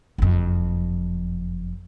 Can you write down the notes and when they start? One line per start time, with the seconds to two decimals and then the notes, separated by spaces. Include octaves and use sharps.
0.18 F#1 F2